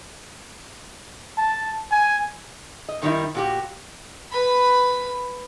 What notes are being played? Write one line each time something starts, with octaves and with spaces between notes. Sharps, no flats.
A5
G#5
D#5
F#2 D#3 G3 C#4 D#4 E4
A#2 F#4 G4
B4 B5